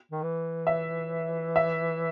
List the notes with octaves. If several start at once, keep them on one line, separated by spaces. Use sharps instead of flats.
D#3
E3
E5
E5